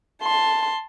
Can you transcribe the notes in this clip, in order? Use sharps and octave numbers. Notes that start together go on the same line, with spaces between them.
A5 C6